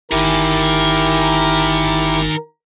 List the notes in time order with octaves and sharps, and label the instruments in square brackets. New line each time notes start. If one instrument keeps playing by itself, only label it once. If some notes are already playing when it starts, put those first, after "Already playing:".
[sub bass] G1 [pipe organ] D#3 D#4 [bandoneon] E4 G4 [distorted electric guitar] A#4 G#5